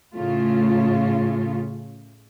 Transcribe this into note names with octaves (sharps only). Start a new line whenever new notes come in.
A2 C#3 A3 F4